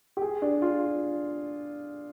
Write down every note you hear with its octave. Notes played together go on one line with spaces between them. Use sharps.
G4
G#4
D4
F4